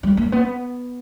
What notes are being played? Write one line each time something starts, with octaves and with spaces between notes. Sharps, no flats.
G3
A#3
B3